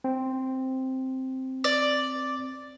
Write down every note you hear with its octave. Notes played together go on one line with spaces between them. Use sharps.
C4
D5